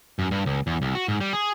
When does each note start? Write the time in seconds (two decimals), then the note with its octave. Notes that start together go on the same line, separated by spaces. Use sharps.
0.19 F#2
0.31 G2
0.46 C#2
0.67 E2
0.82 C2
0.95 F#4
1.08 G#2
1.21 G3
1.33 G#4